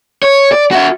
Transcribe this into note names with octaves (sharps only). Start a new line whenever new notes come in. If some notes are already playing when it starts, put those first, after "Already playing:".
C#5
D5
F#4 E5